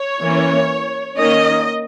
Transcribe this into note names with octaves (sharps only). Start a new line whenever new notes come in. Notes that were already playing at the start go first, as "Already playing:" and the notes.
Already playing: C#5
E3 A#3 C#4
D#3 A#3 C#4 D#5